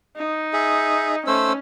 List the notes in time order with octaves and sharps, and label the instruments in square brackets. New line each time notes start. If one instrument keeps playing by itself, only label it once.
[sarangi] D#4
[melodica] G#4 E5
[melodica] A3 C5 E6 [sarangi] C#4